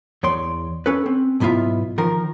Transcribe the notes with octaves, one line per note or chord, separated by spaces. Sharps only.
E2 C#5 D5 C6
C#4 A4 B4
C4
B1 G#2 B3 E4 F4 E5
D#3 F3 A#4